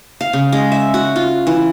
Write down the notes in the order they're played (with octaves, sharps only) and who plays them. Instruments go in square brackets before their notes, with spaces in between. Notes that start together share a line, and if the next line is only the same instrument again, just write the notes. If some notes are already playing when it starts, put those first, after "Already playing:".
[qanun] F5
C#3
G#3
E5
F#4
F4
E3